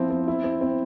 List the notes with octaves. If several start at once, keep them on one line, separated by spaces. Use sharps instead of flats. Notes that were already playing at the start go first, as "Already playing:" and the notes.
Already playing: F3 C4 E4
C4
E4
C4
C4